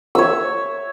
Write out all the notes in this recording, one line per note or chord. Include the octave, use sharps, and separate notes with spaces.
C#5 E5 E6